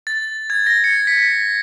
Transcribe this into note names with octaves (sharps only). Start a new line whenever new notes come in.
A6
G#6
A#6
C#7
B6